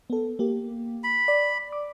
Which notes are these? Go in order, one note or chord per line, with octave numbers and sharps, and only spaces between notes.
B3 A4
A#3 G4
B5
D5
D6